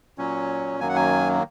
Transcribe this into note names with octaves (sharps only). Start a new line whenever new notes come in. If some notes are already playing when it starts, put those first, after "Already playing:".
A#2 F#3 C#4
F#2 D#3 F#3 A#3 G#5
F#5
G#5